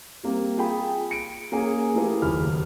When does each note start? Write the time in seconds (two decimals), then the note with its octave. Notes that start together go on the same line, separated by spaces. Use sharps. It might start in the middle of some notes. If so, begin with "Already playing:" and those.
0.23 G3 A#3 C4
0.57 F4 G#4 G5 B5
1.11 C#7 D7
1.52 A#3 C#4 G#4
1.94 A3 E4 F4 G4 G#4 A#4
2.22 F#1 D#2 B5 F6